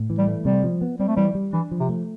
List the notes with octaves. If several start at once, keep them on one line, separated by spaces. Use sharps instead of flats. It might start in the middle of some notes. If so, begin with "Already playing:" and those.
Already playing: A2
E3
G3
A3
C3 G3
F3
B3
G3 C4
A3
E3 G3
G3
E3 D4
F3
C3
A3